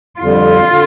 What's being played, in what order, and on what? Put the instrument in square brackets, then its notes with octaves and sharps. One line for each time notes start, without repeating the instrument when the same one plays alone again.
[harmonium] F2 D3 G3 [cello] F4
[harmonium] D3